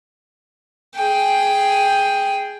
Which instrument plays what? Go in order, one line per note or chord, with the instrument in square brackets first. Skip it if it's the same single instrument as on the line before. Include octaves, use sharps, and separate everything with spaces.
[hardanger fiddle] G#4 G5